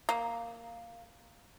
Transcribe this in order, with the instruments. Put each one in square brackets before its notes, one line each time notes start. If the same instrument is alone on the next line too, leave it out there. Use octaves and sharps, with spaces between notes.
[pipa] A#3